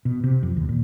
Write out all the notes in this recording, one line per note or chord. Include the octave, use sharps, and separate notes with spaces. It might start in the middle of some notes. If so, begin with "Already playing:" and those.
B2
C3
F2
D#2
A#2